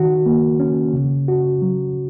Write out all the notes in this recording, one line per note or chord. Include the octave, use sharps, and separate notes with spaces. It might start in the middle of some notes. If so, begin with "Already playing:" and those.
Already playing: D#3 F#4
A#3
C#4
C#3
F#4
F#3